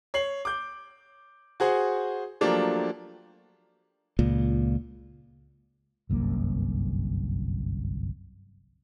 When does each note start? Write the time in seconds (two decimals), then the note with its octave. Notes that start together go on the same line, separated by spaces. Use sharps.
0.14 C#5 C7 F#7
0.45 D6 G6
1.60 F#4 G#4 C5 F#5
2.41 F3 F#3 A3 A#3 D4 G4
4.19 C#2 A#2
6.09 G1 C2 F#2 A#3